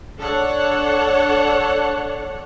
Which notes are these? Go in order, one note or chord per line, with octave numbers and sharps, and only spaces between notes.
D4 A4 C#5 F#5